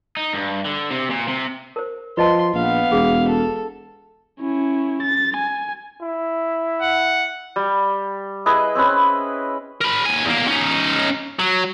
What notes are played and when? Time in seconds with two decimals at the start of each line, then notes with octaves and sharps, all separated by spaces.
0.17 D#4
0.34 G2
0.66 D3
0.91 C3
1.10 A#2
1.28 C3
1.76 A#4 C5
2.17 F3 B4 D#5 A5 C6
2.54 A#1 B3 F5
2.92 E1 G#4
3.28 A4
4.40 C#4 E4
5.02 A6
5.37 G#5
6.02 E4
6.82 F#5
7.56 G3
8.46 E4 G#4 B4 D#5
8.75 C4 C#4 B4
9.81 A#4 B5
10.06 D#2 G#5
10.25 E2 A#3
10.48 C#4 D#4
11.39 F#3